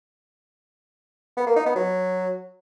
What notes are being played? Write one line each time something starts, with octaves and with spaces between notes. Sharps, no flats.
B3
A#3
D#4
B3
F#3